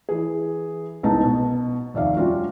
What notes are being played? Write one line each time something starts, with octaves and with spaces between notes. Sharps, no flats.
E3 G#4
C2 G#3 B3 C#4 D#4 A5
B2
F1 D#2 D5 E5 F5
G3 C#4 D4 F4 F#4